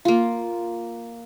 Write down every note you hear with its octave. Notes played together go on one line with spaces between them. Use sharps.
A#3 F4